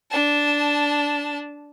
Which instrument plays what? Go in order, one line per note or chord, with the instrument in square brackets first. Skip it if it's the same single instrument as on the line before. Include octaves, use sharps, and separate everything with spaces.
[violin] D4 A5